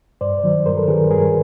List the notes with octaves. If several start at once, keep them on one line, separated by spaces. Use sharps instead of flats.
G2 C5 D5
D#3 F#3
G2 A#4 C5
A4 B4
D#3 F#3 G#4 A#4
G2 G#4 A#4